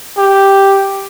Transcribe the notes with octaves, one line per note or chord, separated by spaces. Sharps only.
G4